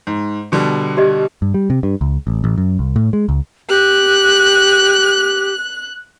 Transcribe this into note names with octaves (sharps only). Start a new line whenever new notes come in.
G#2
B2 D3 G3
G4 D5 D#5
G2
G3
C3
G2
C#2
A1
A1
F#2
C2
A2
G#3
C#2
G4 F#6